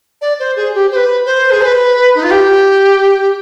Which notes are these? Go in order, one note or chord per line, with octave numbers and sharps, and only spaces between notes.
D5
C5
G#4
G4
C5
B4
C5
G#4
C5
B4
D#4
F4
G4